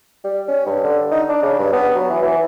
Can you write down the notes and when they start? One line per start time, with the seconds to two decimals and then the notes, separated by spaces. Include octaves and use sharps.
0.24 G3
0.48 C#4
0.66 G2
0.84 D3
1.11 D#4
1.29 D4
1.43 C#3
1.59 G2
1.73 B3
1.95 F#3
2.10 E3
2.23 E3